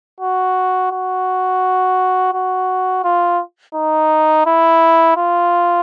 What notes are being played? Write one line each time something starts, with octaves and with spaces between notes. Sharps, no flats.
F#4
F#4
F#4
F4
D#4
E4
F4